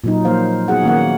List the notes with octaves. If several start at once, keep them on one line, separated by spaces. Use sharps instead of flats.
A#2 F#3 D#4
F3 A#3 C5 F5
B3 D#4 F#4 G#4 F#5
D#3 A#3 C#4 F#5